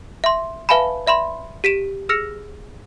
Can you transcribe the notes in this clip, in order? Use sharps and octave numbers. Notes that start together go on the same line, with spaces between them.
E5 C6
B4 E5 F5 G#5 A5 B5
D5 E5 B5 C6
G4 B6 D7 E7
G#4 E6 F6 A#6 C#7 F7